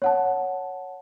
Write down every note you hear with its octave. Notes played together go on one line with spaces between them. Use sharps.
C#5 F#5 A5